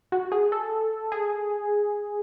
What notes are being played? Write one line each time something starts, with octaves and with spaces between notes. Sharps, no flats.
F#4
G#4
A4
G#4